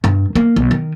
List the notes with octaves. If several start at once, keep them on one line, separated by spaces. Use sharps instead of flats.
G2
A#3
B1
D#3